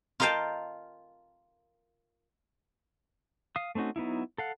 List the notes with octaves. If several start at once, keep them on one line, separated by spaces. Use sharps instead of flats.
F4 A#4 D#5 F5 G5 A5
F5 D#6
A3 C4 C#4 D#4 F#4
F#3 B3 D#4 E4
A4 F5 F#5